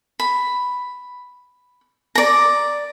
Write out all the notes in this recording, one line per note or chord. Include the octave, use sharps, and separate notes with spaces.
B5
D5 A#5